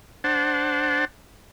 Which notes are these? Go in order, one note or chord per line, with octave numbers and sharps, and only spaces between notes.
D4 C5 F#5 A5